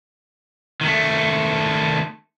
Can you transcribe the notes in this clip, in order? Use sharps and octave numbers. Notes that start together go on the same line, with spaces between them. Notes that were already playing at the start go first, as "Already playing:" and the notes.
D#3 A3